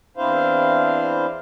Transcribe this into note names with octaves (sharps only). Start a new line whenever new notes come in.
E2 C4 D4 E4 C5 F5